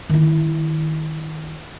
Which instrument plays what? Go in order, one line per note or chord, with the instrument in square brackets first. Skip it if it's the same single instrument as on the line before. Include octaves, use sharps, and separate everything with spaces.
[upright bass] D#3 E4